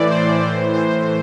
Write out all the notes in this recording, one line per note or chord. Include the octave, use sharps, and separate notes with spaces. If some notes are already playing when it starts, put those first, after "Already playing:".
Already playing: A2 E3 D5
C5
A2 E3 C5
C5